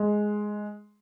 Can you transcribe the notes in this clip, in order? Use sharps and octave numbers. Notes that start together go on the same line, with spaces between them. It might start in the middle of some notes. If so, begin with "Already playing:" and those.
Already playing: G#3